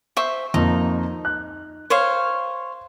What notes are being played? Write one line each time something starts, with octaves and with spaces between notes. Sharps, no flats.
C5 E5 C#6
F2 A#3 D#4
F#6
C5 C#5 F5